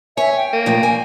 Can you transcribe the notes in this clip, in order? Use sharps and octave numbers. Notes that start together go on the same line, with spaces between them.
C#5 E5 G#5
G5
A#3
A#2 F3 A3
G#5